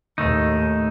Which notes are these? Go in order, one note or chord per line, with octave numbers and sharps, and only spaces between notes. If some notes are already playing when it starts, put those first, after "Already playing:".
D#2 A2 A3 D#4